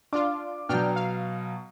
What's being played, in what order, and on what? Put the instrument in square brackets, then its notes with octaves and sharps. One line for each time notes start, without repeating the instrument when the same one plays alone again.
[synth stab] D4 F4 [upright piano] D6
[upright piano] B2 F#3 [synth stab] D4 G5 F6
[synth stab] F5